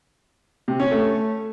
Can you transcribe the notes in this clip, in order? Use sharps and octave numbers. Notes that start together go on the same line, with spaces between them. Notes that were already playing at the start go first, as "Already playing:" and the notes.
C3
C#4
A3